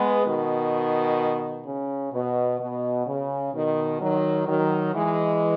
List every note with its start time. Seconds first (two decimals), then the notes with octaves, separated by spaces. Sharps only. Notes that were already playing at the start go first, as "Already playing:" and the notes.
Already playing: G#3 B3
0.24 B2 D#3
1.65 C#3
2.12 B2
2.59 B2
3.07 C#3
3.53 B2 D#3
4.00 D#3 F#3
4.48 D#3 F#3
4.94 E3 G#3